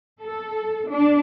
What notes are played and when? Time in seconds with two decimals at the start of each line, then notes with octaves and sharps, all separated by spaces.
0.21 A4
0.89 D4